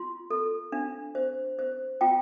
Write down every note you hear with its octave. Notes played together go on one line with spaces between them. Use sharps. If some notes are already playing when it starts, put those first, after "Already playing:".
Already playing: F4 C6
A4
D4
C5
C5
F4 G5